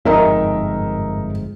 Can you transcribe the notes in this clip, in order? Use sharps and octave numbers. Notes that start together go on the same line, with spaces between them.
G1 F2 G#2 D#4 A#4 E5